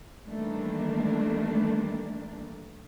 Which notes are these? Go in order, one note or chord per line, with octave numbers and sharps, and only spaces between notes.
D#3 E3 G3 A3 A#3 D4